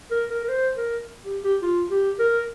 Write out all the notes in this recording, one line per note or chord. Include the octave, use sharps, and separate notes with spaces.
A#4
A#4
A#4
C5
A#4
G4
G4
F4
G4
A#4